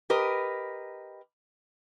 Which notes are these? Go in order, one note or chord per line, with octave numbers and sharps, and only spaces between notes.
G4 A#4 B4 D#5